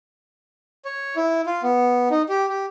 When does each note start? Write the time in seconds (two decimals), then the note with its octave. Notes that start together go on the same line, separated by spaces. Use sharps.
0.85 C#5
1.16 E4
1.46 F4
1.63 B3
2.11 D#4
2.29 G4
2.49 G4